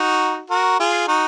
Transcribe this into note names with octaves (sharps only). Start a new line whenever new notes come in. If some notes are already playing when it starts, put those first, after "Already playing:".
Already playing: D#4 F#4
F#4 A#4
F4 G#4
D#4 F#4